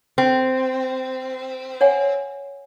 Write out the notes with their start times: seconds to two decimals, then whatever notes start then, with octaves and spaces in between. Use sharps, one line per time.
0.18 C4
1.81 C#5 F#5 G#5